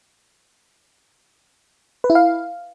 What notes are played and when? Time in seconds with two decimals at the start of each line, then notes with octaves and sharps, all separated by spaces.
2.04 B4
2.10 E4
2.15 F5